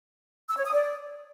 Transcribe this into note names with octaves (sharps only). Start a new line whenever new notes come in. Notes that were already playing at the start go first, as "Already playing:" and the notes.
E6
C#5
D#6
D5